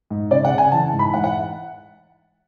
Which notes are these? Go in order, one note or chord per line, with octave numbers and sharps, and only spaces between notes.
G#2
C#3 D5
F#5
C#3
G#5
E3 A5
G#2
B5
G#2 F#5
F#5